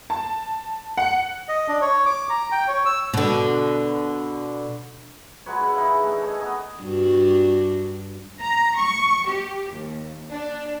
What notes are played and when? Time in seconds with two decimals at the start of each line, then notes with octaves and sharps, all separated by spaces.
0.10 A5
0.97 F#5
1.49 D#5
1.68 D4
1.81 C#5
2.06 D6
2.30 A#5
2.52 G5
2.68 C#5
2.86 E6
3.14 B2 D3
5.46 F#3 G#3 B4 C#5
5.60 D4 E4 F5 B5
5.76 C#3 E3 D#4
6.03 A3 D4
6.22 A4 C#5 D#5 G#5
6.39 B3 D#4 G#4 D#5
6.82 G2 D4 F#4
8.41 A#5
8.77 C#6
9.28 G4
9.73 D#2
10.30 D4